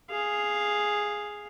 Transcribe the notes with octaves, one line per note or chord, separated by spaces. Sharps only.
G#4 F5